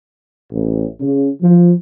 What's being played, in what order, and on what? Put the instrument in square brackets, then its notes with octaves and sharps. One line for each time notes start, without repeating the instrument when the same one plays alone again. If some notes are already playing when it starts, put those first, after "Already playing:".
[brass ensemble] A1
C#3
F3